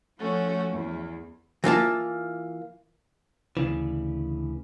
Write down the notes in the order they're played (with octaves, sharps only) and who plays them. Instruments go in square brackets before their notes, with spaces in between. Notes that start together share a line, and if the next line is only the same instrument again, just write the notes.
[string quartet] F3 A3 C#4 F#4
E2
[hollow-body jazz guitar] E3 A#3 F4 A5
[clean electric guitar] D2 C#3 E3